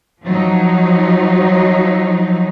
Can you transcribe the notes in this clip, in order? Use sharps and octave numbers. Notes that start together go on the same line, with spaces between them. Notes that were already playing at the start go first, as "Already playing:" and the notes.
F3 F#3 D#4